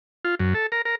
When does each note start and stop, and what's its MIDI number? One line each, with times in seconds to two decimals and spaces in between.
0.25 0.35 65
0.40 0.54 42
0.54 0.67 69
0.72 0.82 70
0.85 0.95 70